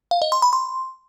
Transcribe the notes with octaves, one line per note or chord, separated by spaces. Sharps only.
F5
D#5
C6
B5
C6